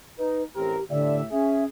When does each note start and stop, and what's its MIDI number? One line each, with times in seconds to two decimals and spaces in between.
0.18 0.43 63
0.18 0.43 71
0.55 0.76 33
0.55 0.76 60
0.55 0.84 67
0.55 0.76 70
0.90 1.25 45
0.90 1.22 50
0.90 1.25 67
0.90 1.16 74
0.90 1.25 76
1.31 1.65 61
1.31 1.67 68
1.31 1.64 76